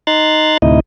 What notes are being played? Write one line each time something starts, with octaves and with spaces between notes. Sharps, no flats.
D#4 A#5 C6 F#6 A6
D2 A2 C3 D#4 E4 D#5